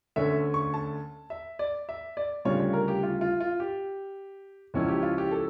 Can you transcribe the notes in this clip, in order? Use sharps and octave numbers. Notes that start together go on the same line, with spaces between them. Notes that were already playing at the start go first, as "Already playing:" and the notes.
D2 D3 A3 C#4 E5
C#6
A5
E5
D5
E5
D5
D2 C#3 G3 D4 F4 C#5
C#5
A#4
G4
F4
F4
F4
G4
C#2 C#3 F3 C#4 E4
G4
F4
G4
A4